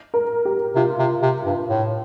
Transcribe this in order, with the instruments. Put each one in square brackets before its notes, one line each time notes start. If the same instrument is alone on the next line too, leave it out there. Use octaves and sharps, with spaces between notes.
[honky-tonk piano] A#4
G4
[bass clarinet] C3 [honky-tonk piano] F4
[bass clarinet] C3
C3
G2
A2